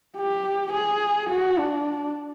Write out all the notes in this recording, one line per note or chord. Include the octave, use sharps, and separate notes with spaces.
G4
G#4
F#4
D4